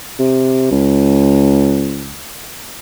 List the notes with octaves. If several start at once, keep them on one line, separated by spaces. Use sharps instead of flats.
C3
C#2